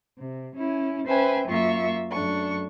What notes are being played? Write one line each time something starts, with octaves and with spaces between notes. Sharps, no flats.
C3
C#4 E4
C#4 B4 C5 E5 G5 G#5
F#2 A#3 F4 E5 C#6
F#2 A3 D4 C#6